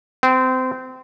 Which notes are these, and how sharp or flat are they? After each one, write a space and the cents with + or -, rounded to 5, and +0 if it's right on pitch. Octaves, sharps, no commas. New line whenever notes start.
C4 -25